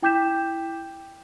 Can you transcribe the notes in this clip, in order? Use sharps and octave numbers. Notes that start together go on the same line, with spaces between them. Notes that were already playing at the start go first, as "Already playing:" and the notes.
E4 G5 D6 G6 B6 E7